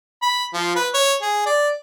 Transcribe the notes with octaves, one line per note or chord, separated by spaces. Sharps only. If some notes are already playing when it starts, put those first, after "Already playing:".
B5
F3
B4
C#5
G#4
D5